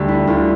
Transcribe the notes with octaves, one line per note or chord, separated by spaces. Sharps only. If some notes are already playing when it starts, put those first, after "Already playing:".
Already playing: D2 G3 G4 A4
E4
D2 F4